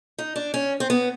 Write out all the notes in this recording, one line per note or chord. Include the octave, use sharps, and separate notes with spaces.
D#4
D4
C#4
C4
B3